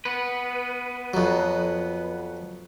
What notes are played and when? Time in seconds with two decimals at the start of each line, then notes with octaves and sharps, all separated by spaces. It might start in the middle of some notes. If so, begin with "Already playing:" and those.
0.05 B3 B4
1.14 F2 F#3